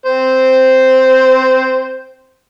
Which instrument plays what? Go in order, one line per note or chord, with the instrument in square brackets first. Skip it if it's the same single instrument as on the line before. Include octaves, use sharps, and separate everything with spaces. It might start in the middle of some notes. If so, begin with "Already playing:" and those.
[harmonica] C4 C5